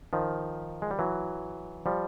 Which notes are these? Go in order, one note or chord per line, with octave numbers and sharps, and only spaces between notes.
D#3 F3
G#3
G3
E3 F#3
F3 G3